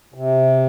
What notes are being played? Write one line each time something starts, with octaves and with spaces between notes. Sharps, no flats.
C3